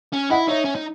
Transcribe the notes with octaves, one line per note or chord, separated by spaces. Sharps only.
C#4
E4 D#5 F#5
D#4 C#5 E5
C#4
D#4